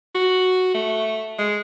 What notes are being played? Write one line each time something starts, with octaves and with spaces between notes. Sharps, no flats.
F#4
A3
G#3